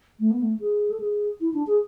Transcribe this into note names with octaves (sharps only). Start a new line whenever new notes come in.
A3
B3
A3
G#4
A4
G#4
E4
D4
G#4